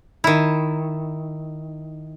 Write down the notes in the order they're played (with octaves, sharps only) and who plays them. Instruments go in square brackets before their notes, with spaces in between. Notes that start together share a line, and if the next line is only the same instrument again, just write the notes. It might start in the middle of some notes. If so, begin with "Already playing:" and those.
[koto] D#3 E4